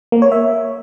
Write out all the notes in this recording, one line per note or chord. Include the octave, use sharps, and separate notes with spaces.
A#3
C#5
E5